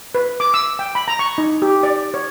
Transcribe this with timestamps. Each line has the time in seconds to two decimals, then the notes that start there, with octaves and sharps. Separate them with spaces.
0.15 B4
0.40 D6
0.54 E6
0.79 G5
0.95 B5
1.08 A#5
1.19 C#6
1.38 D#4
1.62 G4
1.83 D5
2.14 C#5